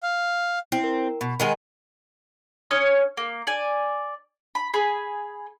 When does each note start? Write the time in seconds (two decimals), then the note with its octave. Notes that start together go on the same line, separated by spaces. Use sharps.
0.03 F5
0.72 C4 E4
0.84 A#4
1.21 B2 B5
1.40 D#3 G#3 G#4 A#4 F#5
2.71 C#4 C#5 D#6 F6
3.17 A#3
3.47 D5 G#5
4.55 B5
4.74 G#4 B5